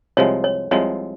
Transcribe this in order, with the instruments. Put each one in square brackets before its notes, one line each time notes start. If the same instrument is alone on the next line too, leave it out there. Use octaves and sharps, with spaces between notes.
[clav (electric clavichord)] C2 C3 F3 G#3 [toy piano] C#5
[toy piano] C#5
[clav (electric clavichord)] C2 C3 F3 G#3 [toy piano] C#5